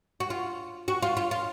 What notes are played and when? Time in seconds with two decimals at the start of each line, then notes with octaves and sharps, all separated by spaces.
0.20 F#4
0.30 F4
0.88 F#4
1.02 F4
1.17 F4
1.31 F4